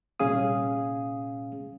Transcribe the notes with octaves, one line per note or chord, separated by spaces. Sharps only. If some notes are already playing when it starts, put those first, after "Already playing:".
C2 A#2 C#4 G#4 F5 D#6